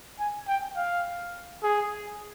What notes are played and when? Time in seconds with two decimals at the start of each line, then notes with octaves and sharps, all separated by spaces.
0.20 G#5
0.48 G5
0.77 F5
1.63 G#4